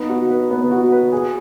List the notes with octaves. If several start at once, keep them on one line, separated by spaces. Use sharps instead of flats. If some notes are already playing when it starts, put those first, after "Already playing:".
Already playing: B3 D#4
F#4
B4
B3
F#4
B4
G#4